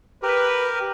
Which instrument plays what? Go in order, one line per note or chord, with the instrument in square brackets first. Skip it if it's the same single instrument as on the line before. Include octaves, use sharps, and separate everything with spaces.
[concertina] G4 A#4 [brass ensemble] B4